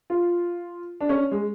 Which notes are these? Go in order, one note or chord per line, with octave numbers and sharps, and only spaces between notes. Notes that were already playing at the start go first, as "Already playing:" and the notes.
F4
D4
C#4
G#3